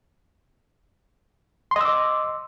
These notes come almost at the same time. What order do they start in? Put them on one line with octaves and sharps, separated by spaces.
C6 D#5 E6 D6